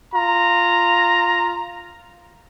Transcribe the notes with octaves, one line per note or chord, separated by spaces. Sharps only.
F4 A#5